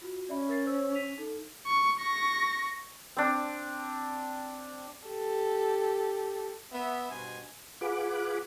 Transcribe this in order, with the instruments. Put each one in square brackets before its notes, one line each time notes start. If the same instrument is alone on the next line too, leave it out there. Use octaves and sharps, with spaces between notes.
[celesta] F4 F#4
[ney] C#4 [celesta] D5 E5 B5
[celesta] A#4 A6 C7
C5 C#5 E6
B6 D#7 F7
D#4 A4
[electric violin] C#6
C#6 A#6
[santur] C4 D4
[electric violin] G4 A4
[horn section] B3 E5
G2 B2 C5 G#5
[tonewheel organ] F4 G#4 B4 F#5 D6